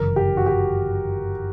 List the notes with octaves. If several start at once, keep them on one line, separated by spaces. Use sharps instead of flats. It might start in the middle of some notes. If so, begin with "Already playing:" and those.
Already playing: G1 F#2 C#3 E3 A#4
G4
F#4
G4